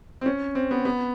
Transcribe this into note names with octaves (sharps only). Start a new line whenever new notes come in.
C4
C#4
C4
B3
B3